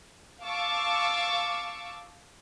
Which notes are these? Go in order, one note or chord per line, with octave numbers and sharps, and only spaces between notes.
F5 A5 C#6 D6 E6